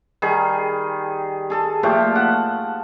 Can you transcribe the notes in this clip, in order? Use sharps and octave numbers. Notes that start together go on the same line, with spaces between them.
D#3 G3 G#4
G#4 A4 A5
A#2 F3 A3 G4
F#5 A5